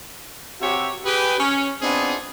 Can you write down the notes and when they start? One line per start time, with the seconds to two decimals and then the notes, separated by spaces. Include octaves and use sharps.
0.61 C3 F#4 G4 C#5 E5
1.05 G4 G#4 B4
1.39 C#4
1.82 B3 C4 D4 D#4 F4 G#4